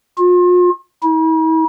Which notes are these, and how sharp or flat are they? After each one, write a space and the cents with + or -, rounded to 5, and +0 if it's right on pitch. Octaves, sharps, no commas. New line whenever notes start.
F4 +40
E4 -45